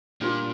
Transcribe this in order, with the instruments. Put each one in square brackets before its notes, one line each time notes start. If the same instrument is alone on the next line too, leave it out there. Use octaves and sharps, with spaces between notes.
[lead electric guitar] A#2 [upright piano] G3 D4 F4 A#4